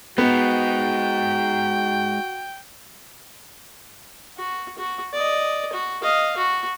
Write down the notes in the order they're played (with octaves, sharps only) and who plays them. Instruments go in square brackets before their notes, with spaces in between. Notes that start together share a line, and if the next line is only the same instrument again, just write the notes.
[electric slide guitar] G#3 D#4 [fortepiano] B3 [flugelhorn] F#4 [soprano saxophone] G5
[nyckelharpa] F#4
F#4
D5 D#5
F#4
D#5 F5
F#4